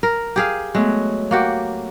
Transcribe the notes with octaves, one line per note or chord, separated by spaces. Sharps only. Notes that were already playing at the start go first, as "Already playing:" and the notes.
A#4
G4 G#4 F5
F#3 G#3 A3 B3
A#3 F#4 G4